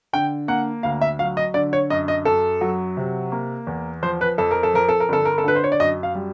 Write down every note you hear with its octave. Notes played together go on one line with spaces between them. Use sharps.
D3 G5
A#3 F#5
D2 F5
E5
F#3 F5
D#5
D3 D5
C#5
F#2 D#5
D#5
F#2 A4
F#3
C3
A#3
E2
F3 C5
B4
F2 A4
A#4
A4
F3 A#4
A4
A#4
G1 A4
A#4
A4
D3 B4
C5
C#5
D5
F#2 D#5
F5
G3